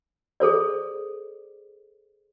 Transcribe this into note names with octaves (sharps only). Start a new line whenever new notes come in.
G#4 A4 C5 D5